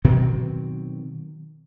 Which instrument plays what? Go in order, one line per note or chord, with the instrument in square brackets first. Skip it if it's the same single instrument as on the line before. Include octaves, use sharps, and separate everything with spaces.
[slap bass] B2 D#3 F#3 C4